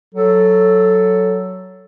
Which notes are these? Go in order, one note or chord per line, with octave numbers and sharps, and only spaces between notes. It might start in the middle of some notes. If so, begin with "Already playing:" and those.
F#3 A4